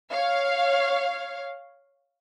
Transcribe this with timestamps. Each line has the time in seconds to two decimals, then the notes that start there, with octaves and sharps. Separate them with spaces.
0.12 C#5 F5